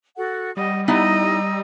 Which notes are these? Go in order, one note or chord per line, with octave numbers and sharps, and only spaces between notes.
F#4 A4 F#5
G3 D#5 F#5
B3 D#4 E4 D#5 A#5 E6